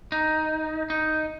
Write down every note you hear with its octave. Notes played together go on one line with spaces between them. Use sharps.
D#4
D#4